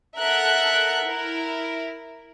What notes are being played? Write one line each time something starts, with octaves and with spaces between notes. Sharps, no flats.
A4 A#4 E5 F#5 F#6
E4 A#4